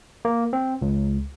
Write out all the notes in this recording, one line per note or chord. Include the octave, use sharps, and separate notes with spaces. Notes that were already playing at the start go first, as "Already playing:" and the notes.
A#3
C4
C#2